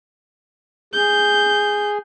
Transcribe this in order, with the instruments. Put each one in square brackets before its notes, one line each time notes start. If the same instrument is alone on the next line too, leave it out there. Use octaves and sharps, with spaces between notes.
[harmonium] G#4 [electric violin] G6